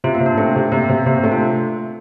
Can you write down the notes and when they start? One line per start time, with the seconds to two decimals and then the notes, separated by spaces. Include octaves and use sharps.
0.04 C3 F4
0.15 A#3
0.20 C3
0.26 D4
0.38 A3 C4
0.56 C3
0.72 C3 A#3
0.89 C3 A#3
1.06 C3 A#3
1.15 C4
1.24 A3 D4
1.32 F4